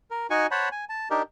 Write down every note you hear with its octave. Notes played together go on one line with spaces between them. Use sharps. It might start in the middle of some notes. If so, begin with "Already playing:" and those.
A#4
D#4 F#4 G#5 C#6
C5 C#5 F#5 A5 B5
G#5
A5
D4 D#4 G4 A#4